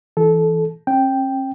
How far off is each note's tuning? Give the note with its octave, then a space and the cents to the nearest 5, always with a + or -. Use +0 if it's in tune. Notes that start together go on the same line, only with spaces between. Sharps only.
E3 +0 A4 -15
C#4 -45 G5 +0